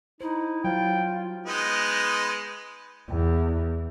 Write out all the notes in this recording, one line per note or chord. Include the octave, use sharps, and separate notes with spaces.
D#4 E4 C5
F#3 F4 C5 G5
G#3 B3 D#4
E2